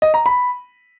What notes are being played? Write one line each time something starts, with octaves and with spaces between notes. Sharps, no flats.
D#5
A#5
B5